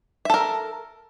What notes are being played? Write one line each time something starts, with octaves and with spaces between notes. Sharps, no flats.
A4 A#4 E5